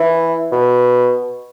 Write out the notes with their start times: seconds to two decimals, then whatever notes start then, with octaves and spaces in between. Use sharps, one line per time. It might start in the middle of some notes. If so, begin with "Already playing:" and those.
Already playing: E3
0.52 B2